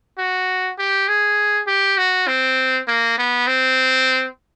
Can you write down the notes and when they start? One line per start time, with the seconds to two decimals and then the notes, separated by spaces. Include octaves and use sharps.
0.18 F#4
0.78 G4
1.08 G#4
1.67 G4
1.97 F#4
2.27 C4
2.87 A#3
3.18 B3
3.47 C4